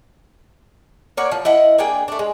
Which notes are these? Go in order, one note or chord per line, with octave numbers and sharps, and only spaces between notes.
A#3 C#5 D5 F#5
F3
E4 D#5 F#5
A#3 D4 G#4 G5
A3 D4
G#3